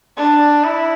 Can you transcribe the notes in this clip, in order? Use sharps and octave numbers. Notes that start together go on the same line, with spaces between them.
D4
E4